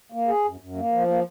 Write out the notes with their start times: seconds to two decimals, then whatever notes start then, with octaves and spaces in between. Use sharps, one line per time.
0.12 A#3
0.28 G#4
0.45 F#2
0.60 F#2
0.76 A#3
0.92 F3
1.07 A#3